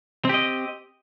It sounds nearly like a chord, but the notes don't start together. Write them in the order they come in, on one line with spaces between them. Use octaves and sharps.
C4 G4 D#5